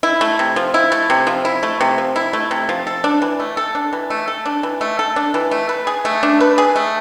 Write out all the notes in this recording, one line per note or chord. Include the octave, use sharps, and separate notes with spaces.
E4
A3
C3
F3
E4
A3
C3
F3
E4
A3
C3
F3
E4
A3
C3
F3
A4
D4
E3
A3
A4
D4
E3
A3
A4
D4
E3
A3
A4
D4
E3
A3
B4
G#4
A3
D4
B4
G#4
A3